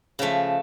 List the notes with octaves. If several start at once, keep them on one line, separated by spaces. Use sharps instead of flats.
C#3 F3 A3